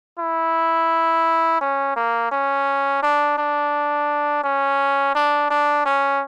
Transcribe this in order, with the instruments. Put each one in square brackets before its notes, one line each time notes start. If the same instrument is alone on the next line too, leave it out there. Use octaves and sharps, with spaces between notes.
[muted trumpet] E4
C#4
A#3
C#4
D4
D4
C#4
D4
D4
C#4